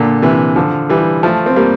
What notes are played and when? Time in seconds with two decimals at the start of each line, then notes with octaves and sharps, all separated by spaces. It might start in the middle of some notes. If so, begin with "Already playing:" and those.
Already playing: A#2 D3
0.22 C3 E3
0.56 D3 F3
0.89 E3 G3
1.23 F3 A3
1.46 C4
1.56 G3 A#3